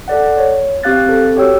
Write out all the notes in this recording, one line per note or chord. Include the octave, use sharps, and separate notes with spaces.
A4 D5 F#5
C#5
C4 G4 F5 F#6 A6
C4 A4
F#4 G4 C#5 G5 E6